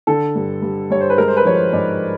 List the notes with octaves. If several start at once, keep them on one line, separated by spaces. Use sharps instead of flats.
D3 A4
G2
G2
G2 C#5
C5
B4
G#3 A#4
C5
B4
F3 C#5
C5
G#2 D5